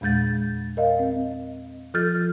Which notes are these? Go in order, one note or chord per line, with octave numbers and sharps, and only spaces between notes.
E2 A#2 G#3 G6 A6
A#4 D#5 F5
C4
F3 F4 A4 F6 G6 A6